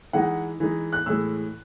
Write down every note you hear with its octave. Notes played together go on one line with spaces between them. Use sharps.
E3 G#3 D#4 F#5
E3 G#3 D#4
F#6
A2 E3 G#3 E6